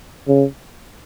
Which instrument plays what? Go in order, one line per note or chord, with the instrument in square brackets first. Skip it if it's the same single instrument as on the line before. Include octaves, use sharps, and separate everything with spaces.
[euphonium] C#3